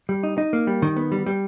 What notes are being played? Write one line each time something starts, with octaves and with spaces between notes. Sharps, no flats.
G3
D#4
D#4
A#3
G3
D#3
B3
G3
G3